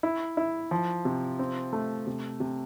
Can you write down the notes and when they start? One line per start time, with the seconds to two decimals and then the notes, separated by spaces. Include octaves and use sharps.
0.03 E4
0.37 E4
0.71 F3
1.05 C3
1.39 C4
1.73 A3
2.07 C3
2.40 C3